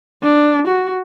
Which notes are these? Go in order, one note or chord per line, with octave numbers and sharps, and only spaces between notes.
D4
F#4